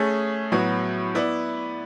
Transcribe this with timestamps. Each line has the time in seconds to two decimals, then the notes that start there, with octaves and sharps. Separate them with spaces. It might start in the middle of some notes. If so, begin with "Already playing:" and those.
Already playing: A3 C#4 G#4
0.52 A2 F#3 B3 F#4
1.15 B3 E4 B4 D5